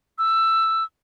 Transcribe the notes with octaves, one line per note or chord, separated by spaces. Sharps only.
E6